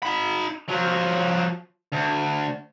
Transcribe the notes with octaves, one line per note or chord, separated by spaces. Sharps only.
D#4 B5
F3 F#3
D2